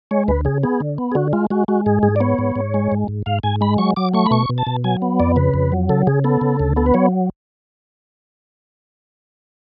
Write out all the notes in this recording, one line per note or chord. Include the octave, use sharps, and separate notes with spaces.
G#3 C#5
D2 B4
C#3 G#4
B3 G#4
D3
B3
G#4
D3 F#4
G#3 F4
G#3 F#4
G#3 F#4
G#2 G#4
G#2 G#4
D5
B3 C#5
G#2
G#2
G#3
G#2
G#2
G#2 F5
G#2 G#5
G#3 B5
F#3 C#6
F#3 D6
A3 C#6
B5
B2 C#6
B2
A5
B2
F#3 G#5
B3
F2 D5
C#3 B4
F2
F#3
C#3 A4
C#3 G#4
B3 A4
C#3
D2
B3 A4
B4
F#3 C#5